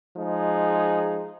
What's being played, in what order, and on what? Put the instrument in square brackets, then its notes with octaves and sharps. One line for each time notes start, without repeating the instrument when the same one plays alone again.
[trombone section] F3 G#3 D#4 G#4